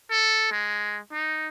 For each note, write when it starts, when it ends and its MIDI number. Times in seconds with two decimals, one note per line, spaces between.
0.11 0.50 69
0.52 0.99 56
1.12 1.49 63